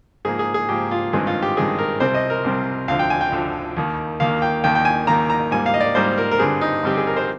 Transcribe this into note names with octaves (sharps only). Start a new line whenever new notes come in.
G#2 F3 A#3 G#4
G#4
G#4
G#2 F3 A#3 G4
F4
G2 D#3 G#3 C4 G#4
F4
G4
G2 D#3 G#3 C4 G#4
A#4
C2 C3 G3 C4 C5
D#5
A#4
C2 C3 G3 C4
D2 D3 F3 F5
G5
G#5
G5
D2 D3 F3
D#2 D#3 A#3
D#2 D#3 A#3 F5
G5
D#2 D#3 A#3 G5
G5
G#5
D#2 D#3 A#3 A#5
A#5
G#2 G3 A#3 G#5
F5
D#5
D5
G#2 G3 A#3 C5
A#4
A#4
G2 D3 G3 C4 G#4
D#4
G2 D3 G3 C4 G4
G#4
A#4
C5